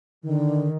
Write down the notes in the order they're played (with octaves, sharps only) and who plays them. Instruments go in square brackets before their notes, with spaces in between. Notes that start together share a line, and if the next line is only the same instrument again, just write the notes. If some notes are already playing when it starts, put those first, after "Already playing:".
[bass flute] D3 [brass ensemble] D#3